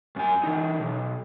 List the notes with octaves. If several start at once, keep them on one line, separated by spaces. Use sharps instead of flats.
F#2 G#5
E3 D#4
B1